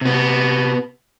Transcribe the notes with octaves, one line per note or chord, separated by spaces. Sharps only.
C3 B3